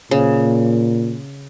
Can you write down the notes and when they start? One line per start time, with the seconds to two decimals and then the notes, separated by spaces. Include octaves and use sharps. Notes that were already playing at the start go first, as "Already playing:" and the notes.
0.11 A#2 C#3